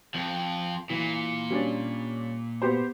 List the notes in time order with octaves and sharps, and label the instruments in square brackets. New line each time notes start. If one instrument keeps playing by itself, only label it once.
[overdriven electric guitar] F2 F3
[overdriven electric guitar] A#2 [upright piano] E3
[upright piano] G3 C#4 D4
B3 G4 C5